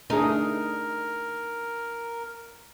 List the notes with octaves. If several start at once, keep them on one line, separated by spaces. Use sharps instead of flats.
A3 D4 D#4 G#4 A#4